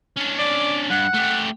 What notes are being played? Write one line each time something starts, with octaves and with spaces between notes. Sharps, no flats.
C#4 D4
D5
G2 F#5
A3 G4